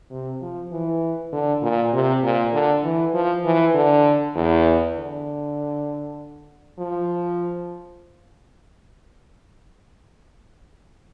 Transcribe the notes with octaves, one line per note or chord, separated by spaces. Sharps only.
C3
F3
E3
D3
A#2
C3
A#2
D3
E3
F3
E3
D3
E2
D3
F3